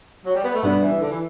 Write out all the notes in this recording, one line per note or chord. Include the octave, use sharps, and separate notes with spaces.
F#3
G3
B3
A3
B2 G3 B3 D4
E3
D3
E3